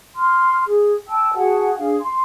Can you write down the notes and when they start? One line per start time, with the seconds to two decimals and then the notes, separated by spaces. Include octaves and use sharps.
0.15 C6 F6
0.66 G#4
1.08 G5 A5 E6
1.34 F#4 G#4 F#5 A5
1.78 D4 G#4 F5
2.01 C6